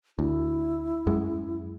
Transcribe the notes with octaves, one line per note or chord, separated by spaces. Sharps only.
D2 E4
F#2 G#3